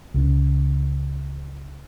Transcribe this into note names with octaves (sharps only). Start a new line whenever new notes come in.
C#2 C#3